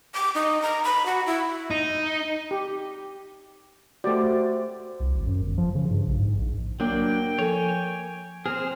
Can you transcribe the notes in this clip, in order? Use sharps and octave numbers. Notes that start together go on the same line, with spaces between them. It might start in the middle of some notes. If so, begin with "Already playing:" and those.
D6
D#4
A#5
B5
F#4
E4
D#4
G4
A3 F#4 G4 C5 D5
C2
G#1
F#2
G1
F3
C#3
G2
A#1
G#2
A#1
F#3 A#3 D4 G5
F3 A4 C#5 G#5
C4 G#4 C5 F6